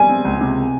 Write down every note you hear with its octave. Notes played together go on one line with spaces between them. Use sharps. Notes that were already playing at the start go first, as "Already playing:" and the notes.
Already playing: G3 G#5
C4
C#2
C3